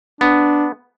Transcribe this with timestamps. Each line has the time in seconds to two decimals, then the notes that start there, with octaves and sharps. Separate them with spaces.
0.21 B3 D4